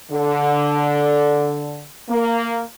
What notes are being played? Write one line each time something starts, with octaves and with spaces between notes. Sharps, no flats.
D3
A#3